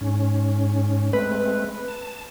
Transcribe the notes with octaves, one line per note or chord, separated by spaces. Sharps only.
G#2 C#4
G#3 A3 C4 B4
A5